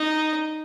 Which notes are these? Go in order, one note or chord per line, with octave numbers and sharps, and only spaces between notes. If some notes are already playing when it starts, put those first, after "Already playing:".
Already playing: D#4